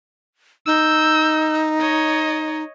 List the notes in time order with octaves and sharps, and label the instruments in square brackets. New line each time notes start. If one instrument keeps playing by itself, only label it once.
[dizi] D#4 [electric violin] E6 G6
[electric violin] C#5 D#5